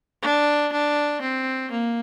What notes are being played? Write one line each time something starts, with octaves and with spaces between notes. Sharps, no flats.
D4
D4
C4
A#3